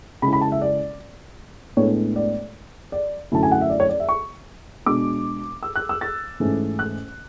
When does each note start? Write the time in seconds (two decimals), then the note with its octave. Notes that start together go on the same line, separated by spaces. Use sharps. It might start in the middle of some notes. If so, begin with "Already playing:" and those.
0.22 C#3 G#3 C#4 E4 B5
0.33 B5
0.41 A5
0.52 E5
0.62 D5
1.77 A2 G#3 B3 D4 C#5
2.16 D5
2.92 D5
3.32 F#2 D3 A3 C#4 E4 A5
3.43 G#5
3.51 F#5
3.61 E5
3.70 D5
3.80 C#5
3.89 D5
4.00 E5
4.09 C#6
4.86 B2 G#3 D4 D6
5.63 E6
5.76 F#6
5.89 E6
6.01 A6
6.40 G#2 E3 A3 C#4 E4
6.79 F#6